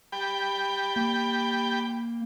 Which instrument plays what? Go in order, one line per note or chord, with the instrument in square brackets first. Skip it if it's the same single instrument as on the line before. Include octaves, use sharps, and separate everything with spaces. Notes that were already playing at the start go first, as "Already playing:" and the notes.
[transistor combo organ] G4 G5 B5
[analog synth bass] A#3